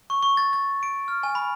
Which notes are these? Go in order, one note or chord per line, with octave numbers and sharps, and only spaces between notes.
C#6
C#6
A6
A6
D7
F6
G#5
B5